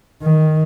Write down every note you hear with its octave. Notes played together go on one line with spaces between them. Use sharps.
D#3